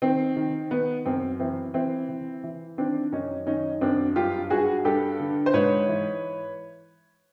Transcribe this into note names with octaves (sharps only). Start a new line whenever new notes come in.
D#3 C4
D#3
D#3 B3
F#2 C4
E3 C4
E3 C4
E3
E3
D#3 C4 D4
F#2 C#4 D#4
D#3 C#4 D#4
F#2 C4 D4
G2 F4 G4
G2 F#4 G#4
G2 G4 A4
D3
C5
G#2 B4 C#5
E3